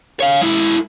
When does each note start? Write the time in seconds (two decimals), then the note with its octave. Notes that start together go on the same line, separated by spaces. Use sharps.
0.21 C#5 F5
0.42 G#3 E4